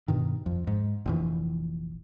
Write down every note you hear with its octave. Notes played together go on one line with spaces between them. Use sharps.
G2 B2 D#3
F2
G#2
F1 A#1 E3